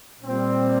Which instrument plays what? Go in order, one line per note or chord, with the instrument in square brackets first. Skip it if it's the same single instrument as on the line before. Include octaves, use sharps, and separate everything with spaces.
[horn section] A#2 G3 C4